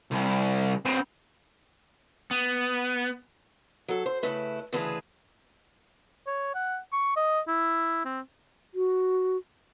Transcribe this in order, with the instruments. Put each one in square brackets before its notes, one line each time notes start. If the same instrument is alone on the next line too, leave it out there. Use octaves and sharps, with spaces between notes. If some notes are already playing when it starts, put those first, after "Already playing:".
[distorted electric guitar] C2
C4 B4
[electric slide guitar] B3
[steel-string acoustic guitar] F#3 A4
C5
C#3 A3 E4 B4
D2 C#3 E3 G#4 B4 A5
[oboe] C#5
F#5
C#6
D#5
E4
C4
[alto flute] F#4